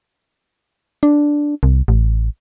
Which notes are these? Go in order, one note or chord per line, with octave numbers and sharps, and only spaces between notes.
D4
C2
A1